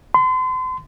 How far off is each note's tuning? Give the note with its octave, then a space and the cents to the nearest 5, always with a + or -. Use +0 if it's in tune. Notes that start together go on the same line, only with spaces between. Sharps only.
C6 -40